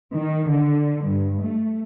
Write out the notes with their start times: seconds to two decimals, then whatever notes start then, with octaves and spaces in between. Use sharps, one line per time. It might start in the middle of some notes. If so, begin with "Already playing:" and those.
0.11 D#3
0.48 D3
1.02 G2
1.41 A3